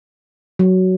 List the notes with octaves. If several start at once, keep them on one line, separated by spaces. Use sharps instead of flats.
F#3